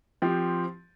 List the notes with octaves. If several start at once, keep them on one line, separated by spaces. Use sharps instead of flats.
F3 C4 G4